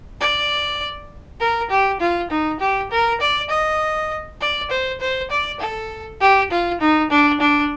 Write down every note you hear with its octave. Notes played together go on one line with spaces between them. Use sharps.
D5
A#4
G4
F4
D#4
G4
A#4
D5
D#5
D5
C5
C5
D5
A4
G4
F4
D#4
D4
D4